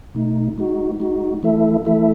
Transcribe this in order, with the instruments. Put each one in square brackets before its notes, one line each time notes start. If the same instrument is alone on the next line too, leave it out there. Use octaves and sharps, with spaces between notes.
[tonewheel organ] B2 A3 D#4
G#3 D#4 F#4
G#3 D#4 F#4
E3 A3 E4 A4 E5
E3 A3 E4 A4 E5